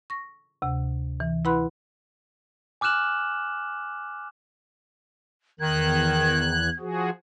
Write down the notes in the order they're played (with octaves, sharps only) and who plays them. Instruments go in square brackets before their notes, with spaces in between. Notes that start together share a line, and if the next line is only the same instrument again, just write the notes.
[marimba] C#6 A#6
D2 C3
E3
E4 B4 F#5 B5 C6 F#6
[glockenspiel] G#5 D6 F6 F#6 E7 F#7
[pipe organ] E2 F#6 [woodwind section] D#3 [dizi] G#6
[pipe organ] F3 F#4 G#4